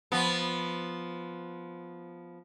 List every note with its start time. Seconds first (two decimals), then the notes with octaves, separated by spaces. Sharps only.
0.12 F3 B3